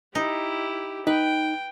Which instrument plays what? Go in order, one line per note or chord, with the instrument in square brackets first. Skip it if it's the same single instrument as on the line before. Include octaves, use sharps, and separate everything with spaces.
[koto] D#4 [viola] E4 G4
[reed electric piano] D#4 [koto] B4 [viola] G5